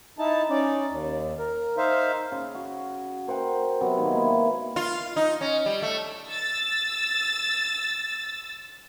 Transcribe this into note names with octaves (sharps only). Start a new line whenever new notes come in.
D#4 E4 A5
C#4 D#4 D5
D#2
A#4
D#4 C5 E5 F5
C#3
F#4
A#4 C5 F#5 G5
C3 F#3 B3
D#3 A#3 B3
G#3 E4 A#4
F4
D#4
C#4
G3
A3
E6 A6